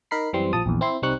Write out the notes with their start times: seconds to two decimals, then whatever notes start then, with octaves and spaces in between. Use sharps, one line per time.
0.11 D#4 A#4 B5 C7
0.33 F#2 E3 G3 C4 C6
0.53 A#1 F3 A5 D#6
0.66 A#1 E2
0.81 C4 E4 C6
1.02 C2 G3 C4 D#4 C#6 F#6